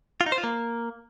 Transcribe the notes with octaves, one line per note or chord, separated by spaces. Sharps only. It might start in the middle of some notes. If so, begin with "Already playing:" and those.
F4
D#4
C5
F4
A#3